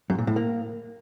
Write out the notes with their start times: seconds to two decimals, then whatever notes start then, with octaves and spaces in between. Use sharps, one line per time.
0.10 F#2
0.19 A#2
0.27 A2
0.36 A#3